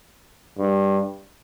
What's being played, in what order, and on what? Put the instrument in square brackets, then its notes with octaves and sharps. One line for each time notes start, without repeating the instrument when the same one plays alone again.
[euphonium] G2